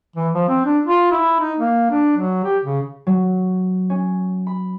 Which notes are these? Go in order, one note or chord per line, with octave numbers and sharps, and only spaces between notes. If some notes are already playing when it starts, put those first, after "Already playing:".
E3
F3
C4
D4
F4
E4
D#4
A#3
D4
F#3
G4
C#3
F#3
C#4
B5